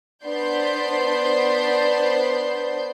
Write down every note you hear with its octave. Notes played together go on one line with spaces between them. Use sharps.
B3 D4 C5 D5 C6 G6